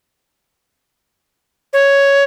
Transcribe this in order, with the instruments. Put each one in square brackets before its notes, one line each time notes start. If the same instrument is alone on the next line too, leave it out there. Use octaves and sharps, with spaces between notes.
[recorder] C#5